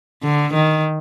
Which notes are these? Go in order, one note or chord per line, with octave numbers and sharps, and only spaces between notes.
D3
D#3